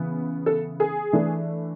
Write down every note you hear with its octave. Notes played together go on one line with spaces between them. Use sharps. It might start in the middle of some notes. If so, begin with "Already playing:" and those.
Already playing: C#3 E3 B3
A4
G#4
E3 A3 D4